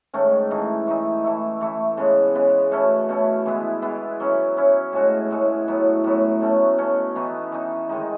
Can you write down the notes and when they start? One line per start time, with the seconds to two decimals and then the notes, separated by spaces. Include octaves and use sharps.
0.13 G#2 D#3 A3 C#4
0.50 E3 A3 D#4
0.87 E3 A3 D#4
1.24 E3 A3 E4
1.61 E3 A3 E4
1.97 C#3 G#3 B3
2.35 C#3 G#3 B3
2.72 B2 A3 C#4 E4
3.09 B2 A3 C#4 E4
3.46 E3 G#3 B3 E4
3.82 E3 G#3 B3 E4
4.20 F#3 C#4 E4
4.56 F#3 C#4 E4
4.93 A2 G#3 C#4 F#4
5.30 A2 G#3 C#4 F#4
5.68 A2 F#3 B3
6.04 A2 F#3 B3
6.41 B2 A3 C#4
6.78 B2 A3 C#4
7.16 E3 B3 D#4
7.52 E3 B3 D#4
7.89 D#3 G#3 D#4